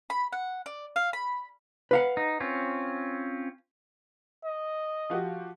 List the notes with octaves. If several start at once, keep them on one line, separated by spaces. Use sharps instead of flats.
B5
F#5
D5
F5
B5
B4 F5 F#5
D#4
C4 C#4 F4
D#5
F3 F#4 G4